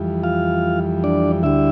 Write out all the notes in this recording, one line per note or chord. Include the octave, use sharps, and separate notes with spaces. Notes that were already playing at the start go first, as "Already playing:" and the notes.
Already playing: F2 E3 G3
F4 F5
D4 D5
D2 D3 G3 E4 E5